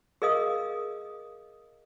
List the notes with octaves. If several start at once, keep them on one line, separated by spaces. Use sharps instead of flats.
G#4 A#4 D#5 F5 D#6